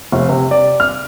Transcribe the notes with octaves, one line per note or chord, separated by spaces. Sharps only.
F1
C3
D5
F6